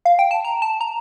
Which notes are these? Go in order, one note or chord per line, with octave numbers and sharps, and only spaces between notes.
F5
G5
A5
A#5
A5
A#5